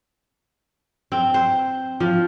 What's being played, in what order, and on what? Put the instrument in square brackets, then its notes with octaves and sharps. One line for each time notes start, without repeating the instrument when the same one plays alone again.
[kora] C4
C5
F3